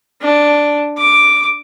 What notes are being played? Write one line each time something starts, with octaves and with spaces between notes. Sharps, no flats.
D4
D6